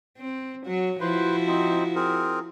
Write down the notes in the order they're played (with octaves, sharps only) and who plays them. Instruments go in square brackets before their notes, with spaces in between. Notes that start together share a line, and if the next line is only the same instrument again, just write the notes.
[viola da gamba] C4
F#3 F#4
[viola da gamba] F3 E4 F#4 [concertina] B4 C5
[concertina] C4 D#4
C4 G#4 A#4